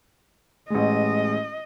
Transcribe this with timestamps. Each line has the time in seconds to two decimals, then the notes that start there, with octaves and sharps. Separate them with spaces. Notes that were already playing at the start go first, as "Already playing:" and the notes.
0.70 A1 G#3 D#5